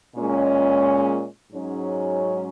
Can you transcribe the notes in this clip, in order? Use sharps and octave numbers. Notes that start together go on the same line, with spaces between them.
A#2 G#3 C#4
G#2 F#3 C#4